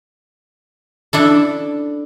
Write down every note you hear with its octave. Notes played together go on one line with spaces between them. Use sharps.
D4 E4 A4